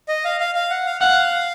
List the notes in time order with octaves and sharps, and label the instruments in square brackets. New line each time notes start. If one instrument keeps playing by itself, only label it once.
[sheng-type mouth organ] D#5
F5
F5
F5
F#5
F5
[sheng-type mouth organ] F5 [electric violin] F#5